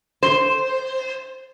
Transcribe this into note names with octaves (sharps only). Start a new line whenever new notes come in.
C5